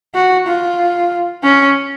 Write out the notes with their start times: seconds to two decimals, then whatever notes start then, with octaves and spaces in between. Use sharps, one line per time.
0.15 F#4
0.47 F4
1.43 C#4